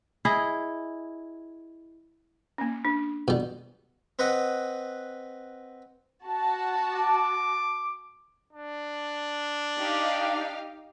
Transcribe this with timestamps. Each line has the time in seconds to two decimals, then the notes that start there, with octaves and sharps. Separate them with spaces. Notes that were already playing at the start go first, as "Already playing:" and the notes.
0.25 E4 G#4 D#5
2.58 A#3 C#4
2.85 D4
3.28 B2 G3
4.19 C4 B4 D#5 F#5
6.24 F#4 A5
6.93 D6
8.53 D4
9.79 D#4 G4 F5